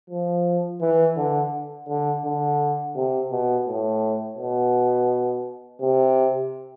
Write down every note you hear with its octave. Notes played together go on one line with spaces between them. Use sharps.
F3
E3
D3
D3
D3
C3
B2
A2
B2
C3